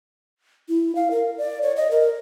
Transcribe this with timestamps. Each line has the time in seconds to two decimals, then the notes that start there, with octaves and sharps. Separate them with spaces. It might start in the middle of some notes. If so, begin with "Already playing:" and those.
0.69 E4
0.95 F5
1.11 A#4
1.38 D5
1.62 C#5
1.77 D#5
1.91 A#4